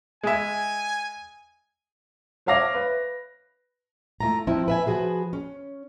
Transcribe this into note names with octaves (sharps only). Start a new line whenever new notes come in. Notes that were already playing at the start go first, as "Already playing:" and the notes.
G#3 E5 G#5
C5 C#5 E5 F5 D6 A#6
B4
A3 E4 F4 A#5
F3 C4 E4
B4 E5 G#5
F3 F#4 G#4 B4
C#4